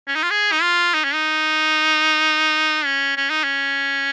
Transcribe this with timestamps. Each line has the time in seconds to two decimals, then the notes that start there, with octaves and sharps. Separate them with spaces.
0.08 C#4
0.16 D#4
0.23 F4
0.30 G#4
0.52 D#4
0.62 F4
0.94 D#4
1.04 C#4
1.14 D#4
2.85 C#4
3.17 C#4
3.30 D#4
3.44 C#4